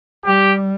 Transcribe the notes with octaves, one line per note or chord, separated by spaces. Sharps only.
G3 G4